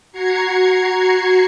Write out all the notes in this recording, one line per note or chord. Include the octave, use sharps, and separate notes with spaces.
F#4 A#5 G#6 C7 C#7